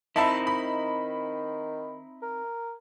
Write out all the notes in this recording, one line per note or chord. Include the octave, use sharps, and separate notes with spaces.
D#3 C4 D#4 E4 E5 A5 B5
B5
A#4